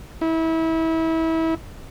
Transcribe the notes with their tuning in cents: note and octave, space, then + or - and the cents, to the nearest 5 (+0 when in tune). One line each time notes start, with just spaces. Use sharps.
E4 -25